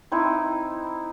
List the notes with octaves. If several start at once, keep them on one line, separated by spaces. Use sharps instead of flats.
C4 D#4 E4